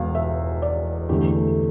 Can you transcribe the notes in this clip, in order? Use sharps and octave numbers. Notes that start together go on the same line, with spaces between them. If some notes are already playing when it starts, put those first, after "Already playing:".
Already playing: E1 E2 B2 F5
E5
D5
E2 D3 A3 G4